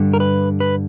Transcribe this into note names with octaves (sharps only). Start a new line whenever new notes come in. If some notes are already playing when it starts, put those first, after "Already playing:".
Already playing: G2 D3 G3
A#4
B4
B4